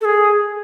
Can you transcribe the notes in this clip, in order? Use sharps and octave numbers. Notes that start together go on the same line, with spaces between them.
A4
G#4